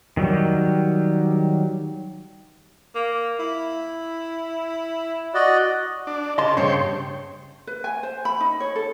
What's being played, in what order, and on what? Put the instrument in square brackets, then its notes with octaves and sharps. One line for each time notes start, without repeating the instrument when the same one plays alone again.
[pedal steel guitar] D#3 F#3 G3
[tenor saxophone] A#3
E4
[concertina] F#4 D5 D#5
[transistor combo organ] D4
[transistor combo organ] C#3 A5 [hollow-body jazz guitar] D#5 C6
[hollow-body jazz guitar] G2 C#3 [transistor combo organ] C5 C#5 G5
[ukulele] B4
G#5
C5
B5
D#4
C#5
A4